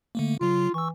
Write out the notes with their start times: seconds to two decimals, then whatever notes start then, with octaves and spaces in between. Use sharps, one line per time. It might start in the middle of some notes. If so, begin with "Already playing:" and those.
0.15 D3 A3 A#3
0.41 C#3 F#3 F4
0.74 E3 C#6 E6